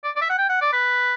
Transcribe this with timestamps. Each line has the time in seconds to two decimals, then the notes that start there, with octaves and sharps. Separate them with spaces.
0.04 D5
0.16 D5
0.21 E5
0.30 F#5
0.38 G5
0.49 F#5
0.61 D5
0.73 B4